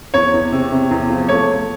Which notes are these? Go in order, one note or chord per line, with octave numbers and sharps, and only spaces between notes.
E2 C#5
E2
C3
C3
E2
F3
A3 C#5
A3